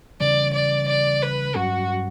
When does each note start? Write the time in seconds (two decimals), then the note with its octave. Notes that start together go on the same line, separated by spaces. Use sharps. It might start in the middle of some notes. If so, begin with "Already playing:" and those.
0.20 C#3 E3 G3 D5
0.54 D5
0.88 D5
1.22 B4
1.55 G2 F#3 C#4 F#4